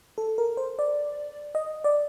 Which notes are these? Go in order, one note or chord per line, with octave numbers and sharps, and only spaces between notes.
A4
A#4
C5
D5
D#5
D5